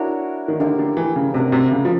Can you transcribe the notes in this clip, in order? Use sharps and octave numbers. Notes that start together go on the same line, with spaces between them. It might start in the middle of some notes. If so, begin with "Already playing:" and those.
Already playing: D4 E4 F#4 A#4 C#5
D#3
D3 A#3 D#4 G4 A#4
D3
E3
C#3
C3 A#3 D4 F#4 A#4
C3
C#3
F3